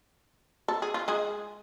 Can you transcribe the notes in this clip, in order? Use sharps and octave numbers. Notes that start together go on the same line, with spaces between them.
A4
G#4
F4
G#3 G#4